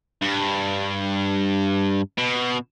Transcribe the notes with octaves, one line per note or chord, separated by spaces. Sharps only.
G2
B2